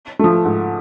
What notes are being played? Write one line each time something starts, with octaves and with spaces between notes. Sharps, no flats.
F3 A3
G#2